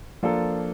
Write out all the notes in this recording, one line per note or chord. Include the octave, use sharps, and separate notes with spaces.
F3 A#3 D4 F4 A4